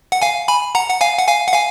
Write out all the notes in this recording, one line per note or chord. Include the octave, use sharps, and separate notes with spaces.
F#5
F5 G#5
G#5 B5
F#5 A#5
F#5
F5 G#5
F#5
F5 G#5
F#5
F5 G#5